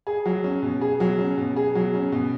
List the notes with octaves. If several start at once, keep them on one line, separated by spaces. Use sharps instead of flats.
G#4
F#3
C#4
B2
G#4
F#3
C#4
B2
G#4
F#3
C#4
B2